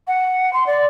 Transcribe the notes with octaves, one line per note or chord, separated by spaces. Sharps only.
F#5
C6
D5